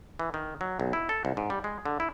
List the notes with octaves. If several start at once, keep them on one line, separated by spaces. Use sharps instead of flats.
E3
D#3
F#3
B1
E4
A4
C2
G#2
G3
G#3
D3
E4